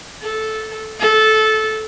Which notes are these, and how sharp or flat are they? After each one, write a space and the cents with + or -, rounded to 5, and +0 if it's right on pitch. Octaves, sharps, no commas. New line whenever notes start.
A4 -10
A4 -15